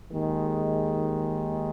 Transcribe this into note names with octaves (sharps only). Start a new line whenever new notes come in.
D#2 D#3 G#3